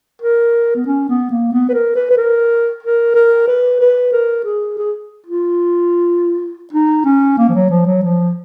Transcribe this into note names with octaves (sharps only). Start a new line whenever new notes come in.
A#4
B3
C#4
B3
A#3
B3
B4
A#4
B4
B4
A#4
A#4
A#4
B4
B4
A#4
G#4
G#4
F4
D#4
C#4
A#3
F3
F#3
F3
F#3
F3